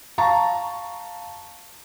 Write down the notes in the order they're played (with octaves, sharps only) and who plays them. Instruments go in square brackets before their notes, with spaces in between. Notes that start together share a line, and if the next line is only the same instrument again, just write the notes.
[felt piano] F5 A5 A#5 C#6 A6